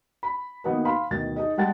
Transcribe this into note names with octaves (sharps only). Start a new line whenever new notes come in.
B5
D#3 A#3 B3 D#4 F#4 B4
F5 B5 C6
D2 B2 D#3 A6
D#4 G#4 D#5
G3 G#3 F#5 A5 A6